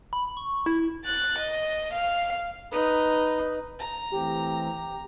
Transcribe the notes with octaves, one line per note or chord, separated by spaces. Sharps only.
B5
C#6
E4
F#6 A6
D#5
F5
D#4 B4
A#5
E3 A3 C4 G4